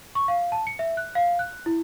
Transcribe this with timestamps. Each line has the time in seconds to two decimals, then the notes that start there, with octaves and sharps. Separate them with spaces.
0.15 C#6
0.28 F5
0.52 A5
0.67 C#7
0.79 E5
0.97 F#6
1.15 F5
1.39 F#6
1.66 E4